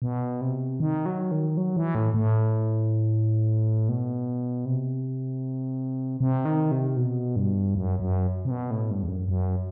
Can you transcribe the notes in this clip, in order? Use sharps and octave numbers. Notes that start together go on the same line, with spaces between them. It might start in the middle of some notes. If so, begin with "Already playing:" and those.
B2
C3
D#3
F#3
D#3
F#3
E3
A2
A2
B2
C3
C3
D#3
C3
B2
G2
F#2
F#2
C3
B2
A2
G2
E2
F#2
F#2